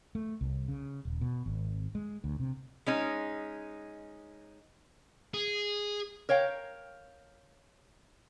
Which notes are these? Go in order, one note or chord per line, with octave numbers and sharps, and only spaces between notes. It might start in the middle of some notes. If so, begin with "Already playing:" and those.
A3
C2
C#3
D#1
B2
G#1
G#3
D2
C3
G#3 C#4 D#4
G#4
A#4 C#5 F5 G5